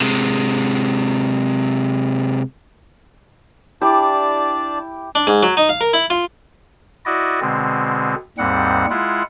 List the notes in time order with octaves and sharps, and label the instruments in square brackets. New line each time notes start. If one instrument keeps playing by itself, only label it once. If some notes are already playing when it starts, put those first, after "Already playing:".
[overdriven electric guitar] C3 G#3
[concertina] D4 D5 A5 [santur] E4 G4 E5
[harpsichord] D4
G#2
F#3
D#4
F5
A#4
E4
F4
[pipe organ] E4 F#4 D5 D#5
B2 D3 G#3 C4
D#2 G#2 G3 C4 F#5
G#3 E4 F4 F#5